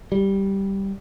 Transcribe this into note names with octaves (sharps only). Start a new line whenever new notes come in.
G3